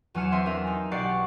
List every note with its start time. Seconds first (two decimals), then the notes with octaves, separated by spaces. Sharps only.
0.15 E2 F#3 G#5 F6 C#7 E7
0.32 C4 E5 G#5 C6
0.46 D4 A#4 E5
0.67 D#4
0.91 B1 G4 D5 F#5 C#6 C7